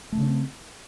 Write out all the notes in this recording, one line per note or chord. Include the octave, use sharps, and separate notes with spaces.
C#3 A3 C4 C#4